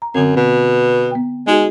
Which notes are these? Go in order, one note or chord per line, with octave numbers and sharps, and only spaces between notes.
A#5
F#2 D3 C4
B2
B3 G5
G#3 D#4 F#4 G#4